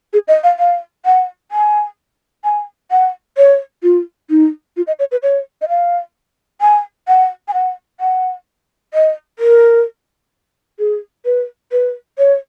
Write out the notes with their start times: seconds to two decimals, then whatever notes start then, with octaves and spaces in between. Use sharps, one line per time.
0.13 G#4
0.28 D#5
0.44 F5
0.59 F5
1.06 F#5
1.52 G#5
2.44 G#5
2.91 F#5
3.37 C#5
3.83 F4
4.30 D#4
4.77 F4
4.87 D#5
4.99 C#5
5.12 B4
5.23 C#5
5.62 D#5
5.69 F5
6.61 G#5
7.08 F#5
7.48 G#5
7.54 F#5
8.00 F#5
8.94 D#5
9.39 A#4
10.79 G#4
11.25 B4
11.72 B4
12.18 C#5